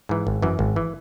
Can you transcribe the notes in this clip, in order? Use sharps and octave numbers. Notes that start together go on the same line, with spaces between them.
G#2 E3
G#1
F#2 E3
G#1
E3